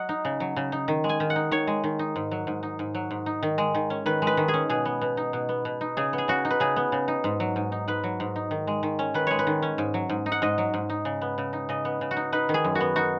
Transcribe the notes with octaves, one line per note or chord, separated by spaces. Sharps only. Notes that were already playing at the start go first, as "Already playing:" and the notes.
Already playing: F#3 D#5 F#5
D#4
C#3
F#3
C#3
D#4
D#3
G#3
G#5
D#3
F#5
D#4
D#3 C#5
G#3
D#3
D#4
G#2
F#3
G#2
D#4
G#2
F#3
G#2
D#4
D#3
G#3
D#3
C#4
D#3 B4
G#3
B4
D#3
G#4
C#4
B2 G#4
B3
B2
D#4
B2
B3
B2
D#4
C#3 G#4
B3
G#4
C#3 F#4
D#4
B4
C#3 G#4
B3
C#3
D#4
G#2
F#3
G#2
D#4
G#2 B4
F#3
G#2
D#4
D#3
G#3
D#3
C#4
D#3 B4
G#3 C#5
B4
D#3
C#4
G#2
F#3
G#2
D#4
F#5
G#2 D#5
F#3
G#2
D#4
C#3
B3
C#3
D#4
C#3 D#5
B3
C#3
F#4
D#4
D#4 B4
D#3
G#4
F#2
F#4
B3
D#4 F#4